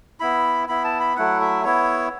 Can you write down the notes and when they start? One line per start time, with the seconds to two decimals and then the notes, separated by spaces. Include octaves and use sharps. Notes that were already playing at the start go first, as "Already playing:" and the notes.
0.20 B3 E4 B5
0.69 B3 E4 B5
0.84 A5
1.00 B5
1.16 F#3 A3 E4 F#5
1.41 E5
1.64 B3 E4 C#5